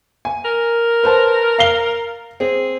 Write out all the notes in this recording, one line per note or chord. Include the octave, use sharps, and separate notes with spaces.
G#5
A#4
B4 C5 A5
F5 C7 G7
C4 G#4